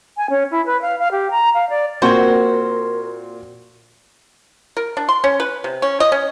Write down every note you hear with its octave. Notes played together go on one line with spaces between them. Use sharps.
G#5
C#4
E4
B4
F5
F5
G4
A#5
F5
D5
A#2 C4 F#4 A#4 C5 G#6
A#4
D4
C6
C#4
B4
C3
C#4
D#5
C#4